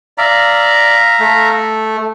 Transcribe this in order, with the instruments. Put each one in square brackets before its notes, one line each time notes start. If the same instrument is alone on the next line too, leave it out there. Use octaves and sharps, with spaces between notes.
[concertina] D5 [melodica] E5 F5 A#5
[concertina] A3